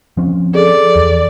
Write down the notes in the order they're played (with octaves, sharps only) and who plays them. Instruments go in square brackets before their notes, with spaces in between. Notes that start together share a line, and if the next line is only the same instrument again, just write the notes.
[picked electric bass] F3 C4 C#4
[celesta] G#4 A4 [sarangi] D5
[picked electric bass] E2